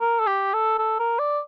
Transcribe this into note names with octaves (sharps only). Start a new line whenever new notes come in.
A#4
A4
G4
A4
A4
A#4
D5